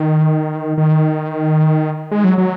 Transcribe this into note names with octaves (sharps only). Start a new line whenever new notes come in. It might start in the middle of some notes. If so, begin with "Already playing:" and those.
Already playing: D#3
D#3
G#3
F#3
F#3